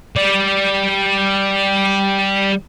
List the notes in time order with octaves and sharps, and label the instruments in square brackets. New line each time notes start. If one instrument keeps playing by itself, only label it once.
[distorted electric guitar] G3 D5